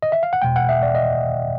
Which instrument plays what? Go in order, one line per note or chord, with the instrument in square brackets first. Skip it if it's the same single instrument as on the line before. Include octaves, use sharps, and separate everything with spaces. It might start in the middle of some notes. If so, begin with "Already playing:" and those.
[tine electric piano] D#5
E5
F5
F#5
E2 B2 G#3 G5
F#5
E5
D5
D#5